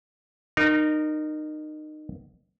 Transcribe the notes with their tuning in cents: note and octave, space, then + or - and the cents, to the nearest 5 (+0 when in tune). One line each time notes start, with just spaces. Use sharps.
D#4 -25 A#4 +0